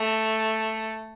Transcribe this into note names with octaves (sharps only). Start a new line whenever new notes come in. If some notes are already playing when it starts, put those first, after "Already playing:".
Already playing: A3